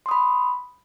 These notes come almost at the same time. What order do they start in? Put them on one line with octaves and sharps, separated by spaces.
C6 D#6 B5